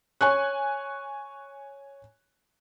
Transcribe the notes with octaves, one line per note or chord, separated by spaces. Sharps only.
C#5 G#5 C#6 F#6